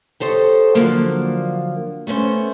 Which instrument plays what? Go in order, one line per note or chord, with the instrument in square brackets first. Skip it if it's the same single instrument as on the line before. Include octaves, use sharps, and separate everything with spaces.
[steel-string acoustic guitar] G4 A4 C5 C#5 D#5
D3 F3 F#3 A#3 D4
A3 B3 C#4 C5